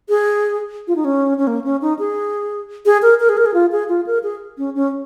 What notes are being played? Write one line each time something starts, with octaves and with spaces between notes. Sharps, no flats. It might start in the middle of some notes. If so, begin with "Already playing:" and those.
G#4
F4
D#4
C#4
C#4
A#3
C#4
D#4
G#4
G#4
A#4
A#4
G#4
A#4
G#4
F4
G#4
F4
A#4
G#4
C#4
C#4